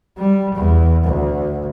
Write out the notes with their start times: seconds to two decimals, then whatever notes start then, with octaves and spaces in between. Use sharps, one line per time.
0.18 G3
0.55 E2
1.04 D2